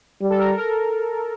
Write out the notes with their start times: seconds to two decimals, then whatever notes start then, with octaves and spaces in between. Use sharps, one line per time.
0.21 G3
0.30 A4
0.38 A#4
0.58 A#4